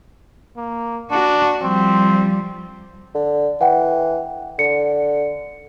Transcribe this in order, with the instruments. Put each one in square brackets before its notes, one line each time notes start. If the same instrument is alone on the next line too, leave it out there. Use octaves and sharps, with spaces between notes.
[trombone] A#3
[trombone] D4 [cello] F#4
[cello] F3 G3 [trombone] C4
[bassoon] D3
[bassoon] E3 [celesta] F#5 G5
[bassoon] D3 [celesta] C#7